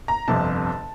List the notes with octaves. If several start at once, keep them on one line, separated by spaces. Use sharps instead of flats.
A#5
G1 F2 C3 A5